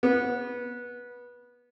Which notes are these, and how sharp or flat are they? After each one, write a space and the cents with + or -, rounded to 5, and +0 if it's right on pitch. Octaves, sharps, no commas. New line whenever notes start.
B3 -20